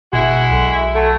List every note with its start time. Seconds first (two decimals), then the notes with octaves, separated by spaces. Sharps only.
0.13 G1 B2 G#3 E4 F#4
0.50 B1 A4
0.94 F#3 A3